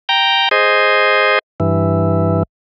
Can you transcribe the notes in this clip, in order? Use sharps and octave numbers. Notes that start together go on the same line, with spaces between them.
G5 A#5
G#4 C5 D#5
G2 E3